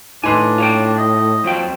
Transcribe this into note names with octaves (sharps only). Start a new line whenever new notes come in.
A2 D4 D#4 B4 G#5 C6
F4 C#5 G5
D#5
F2 F3 F#3 G5